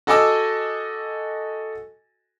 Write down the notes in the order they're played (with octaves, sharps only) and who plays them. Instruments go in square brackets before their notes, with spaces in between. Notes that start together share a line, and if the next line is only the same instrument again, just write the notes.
[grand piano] F#4 A4 D#5 G#5 D6 E6